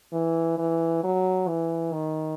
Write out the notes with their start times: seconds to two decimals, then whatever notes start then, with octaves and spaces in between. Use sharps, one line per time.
0.13 E3
0.58 E3
1.03 F#3
1.48 E3
1.93 D#3